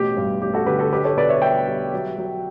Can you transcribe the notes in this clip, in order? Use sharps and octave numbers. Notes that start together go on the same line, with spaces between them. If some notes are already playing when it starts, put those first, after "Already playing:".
Already playing: A1 B2 G4
G2
A1 G4
F#4 A4
D3 G4 B4
F#4 A4
B1 G4 B4
A4 C#5
B2 B4 D5
C#5 E5
G3 E5 G5
G3
F#3
F#3